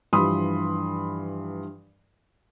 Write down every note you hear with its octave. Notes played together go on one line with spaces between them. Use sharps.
G2 E3 F3 B5 C6 D#6